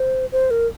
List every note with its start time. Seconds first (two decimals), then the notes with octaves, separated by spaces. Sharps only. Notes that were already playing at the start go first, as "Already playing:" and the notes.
Already playing: C5
0.32 C5
0.51 A#4